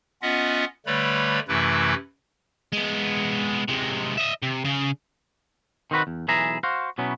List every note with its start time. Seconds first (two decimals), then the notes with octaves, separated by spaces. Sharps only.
0.22 B3 C#4 F4 D#5 E5 F#5
0.86 D3 G3 A3 B4 C#5 B5
1.48 F#2 C3 E3 A3 E4 B4
2.73 G#3 B3
3.68 C3 G#3
4.18 D#5 E5
4.43 C3
4.65 C#3 G#4
5.91 D#3 C4 F#4 B4
6.07 E2
6.28 B1 E3 G#4 E5 A#5
6.63 F#4 C5 F5
6.98 B2 F#3 B3 C#4 E4